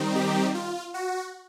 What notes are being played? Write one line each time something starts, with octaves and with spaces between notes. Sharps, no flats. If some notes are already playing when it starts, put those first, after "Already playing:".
Already playing: D#3 G3 C4 D#4
G4
F4
F#4